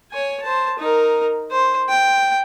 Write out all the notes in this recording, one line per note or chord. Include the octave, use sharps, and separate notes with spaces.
C#5 G#5
C5 A5
D#4 A#4
C5
G5